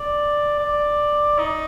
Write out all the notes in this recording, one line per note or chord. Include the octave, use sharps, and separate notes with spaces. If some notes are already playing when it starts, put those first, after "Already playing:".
Already playing: D5
D5
D#4